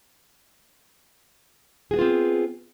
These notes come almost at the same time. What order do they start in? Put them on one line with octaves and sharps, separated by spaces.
G#4 F#4 B3 F4 C4